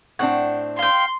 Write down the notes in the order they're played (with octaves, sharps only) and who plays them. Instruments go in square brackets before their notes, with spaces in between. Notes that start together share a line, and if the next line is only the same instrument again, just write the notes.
[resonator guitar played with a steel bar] A2 C4 D4 [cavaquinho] F#5
[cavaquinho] F5 G5 [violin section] C6